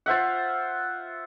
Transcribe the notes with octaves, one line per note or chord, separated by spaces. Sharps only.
F4 C5 E5 F#5